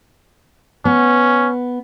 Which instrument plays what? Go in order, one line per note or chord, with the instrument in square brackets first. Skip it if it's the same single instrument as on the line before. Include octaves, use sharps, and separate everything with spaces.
[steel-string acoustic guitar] B3 [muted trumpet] C#4